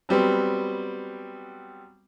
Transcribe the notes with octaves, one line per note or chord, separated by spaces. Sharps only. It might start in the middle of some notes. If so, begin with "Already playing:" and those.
F#3 G3 B3 C4